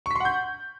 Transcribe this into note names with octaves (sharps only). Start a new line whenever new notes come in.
F#5 C6 C#6 G6 B6